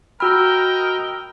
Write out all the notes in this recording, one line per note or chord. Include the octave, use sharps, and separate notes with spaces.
F#4 A#4 D#5 G5 A#5 B5 E6 F6